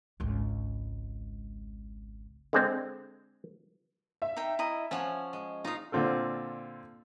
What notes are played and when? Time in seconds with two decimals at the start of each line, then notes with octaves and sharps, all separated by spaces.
0.20 G#1 C#2
2.53 D3 G#3 C4
4.22 E5
4.37 D#4 G5
4.59 E4 D#5 A#5
4.91 F3 C#4 C#5 F#5 G#5
5.33 G#3
5.65 D#4 F4 F5 D#6
5.92 A#2 D3 C4 F4 A4